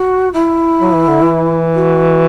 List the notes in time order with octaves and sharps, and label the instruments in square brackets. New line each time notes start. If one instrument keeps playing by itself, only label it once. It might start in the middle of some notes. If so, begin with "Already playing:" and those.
Already playing: [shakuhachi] F#4
E4
[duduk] F#3
E3
D3
E3
[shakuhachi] F#4